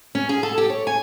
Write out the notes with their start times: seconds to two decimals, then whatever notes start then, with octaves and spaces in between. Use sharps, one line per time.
0.15 C#4
0.29 G#4
0.43 A4
0.58 G4
0.70 C#5
0.87 G#5